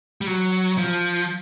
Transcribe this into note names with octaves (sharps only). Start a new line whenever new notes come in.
G3
F#3
F3